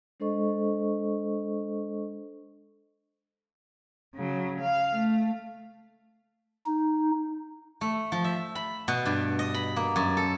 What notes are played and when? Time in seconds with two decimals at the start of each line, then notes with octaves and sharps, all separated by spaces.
0.20 G#3 D4 A4 C5 D#5 C#6
4.15 C#3 F#3
4.60 F5
4.92 A3
6.66 D#4
7.81 A3
8.12 F3
8.24 E5
8.55 B5
8.88 B2
9.05 G2
9.39 D#5
9.54 B5
9.76 A#3
9.96 F#2
10.17 A4